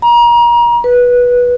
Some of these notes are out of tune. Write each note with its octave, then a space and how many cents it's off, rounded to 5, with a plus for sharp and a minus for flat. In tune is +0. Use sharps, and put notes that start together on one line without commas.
A#5 +30
B4 -15